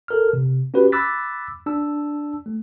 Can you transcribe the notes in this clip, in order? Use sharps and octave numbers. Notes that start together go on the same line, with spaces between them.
A4 A#4 F6
C3
C#4 F#4 G4 B4
B5 D6 E6 F#6 A6 B6
D4 A5 E6
A3